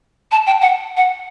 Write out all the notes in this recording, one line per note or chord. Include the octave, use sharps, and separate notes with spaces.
A5
G5
F#5
F#5